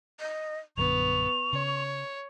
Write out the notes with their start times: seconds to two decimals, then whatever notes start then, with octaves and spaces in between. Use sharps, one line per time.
0.20 D#5
0.77 A#1 F#2 D3 B3 C#6 F7
1.53 C#3 C#5